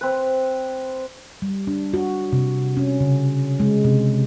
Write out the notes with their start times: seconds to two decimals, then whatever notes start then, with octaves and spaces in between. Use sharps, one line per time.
0.01 C4 B4
1.42 G3
1.67 D4
1.94 F#4
2.32 C3
2.77 C#4
3.00 C#3
3.60 G#3
3.84 C3